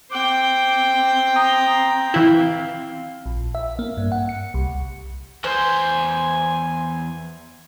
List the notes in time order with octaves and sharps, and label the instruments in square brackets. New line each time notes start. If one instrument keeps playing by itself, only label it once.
[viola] C4 [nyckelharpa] C5 G5 [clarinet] D6
[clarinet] A#5 [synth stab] D#6
[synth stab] E3 E4 [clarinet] F5
[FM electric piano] A#1
E5
A#3
G2
F#5
C#7
C2
[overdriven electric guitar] E2 C6 [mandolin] C5 [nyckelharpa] G#5